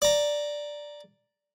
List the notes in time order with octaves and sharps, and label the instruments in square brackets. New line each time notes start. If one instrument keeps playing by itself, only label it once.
[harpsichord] D5 A#5